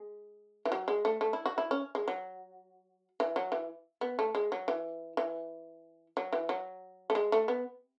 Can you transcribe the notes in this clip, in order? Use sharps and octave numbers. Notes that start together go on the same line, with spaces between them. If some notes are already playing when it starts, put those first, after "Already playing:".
Already playing: G#3
E3
F#3
G#3
A3
A3
E4
F#4
E4
C#4
G#3
F#3
E3
F#3
E3
B3
A3
G#3
F#3
E3
E3
F#3
E3
F#3
A3
G#3
A3
B3